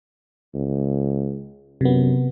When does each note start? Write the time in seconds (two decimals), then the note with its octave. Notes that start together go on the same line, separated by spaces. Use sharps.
0.55 C#2
1.81 F#2 C3 B3